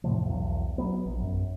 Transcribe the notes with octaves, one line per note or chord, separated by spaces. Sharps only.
E2 A2 C3 F3
B1 E2
F#3 B3
A#1
F#2